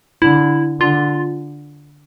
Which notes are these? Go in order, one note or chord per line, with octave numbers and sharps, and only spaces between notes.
D3 E4
D3 F4